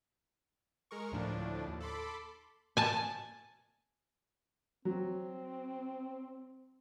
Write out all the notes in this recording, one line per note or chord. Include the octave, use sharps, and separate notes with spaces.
G#3 A#4 C#6
D2 A2 F3 D4
D#2
A4 B5 C6 D6
G#5 A5
F#3 C4